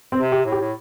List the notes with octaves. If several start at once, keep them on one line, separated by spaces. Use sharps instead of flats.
C4
C3
G4
A2
G4
A2